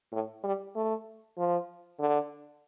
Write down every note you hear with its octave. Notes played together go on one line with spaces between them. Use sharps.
A2
G3
A3
F3
D3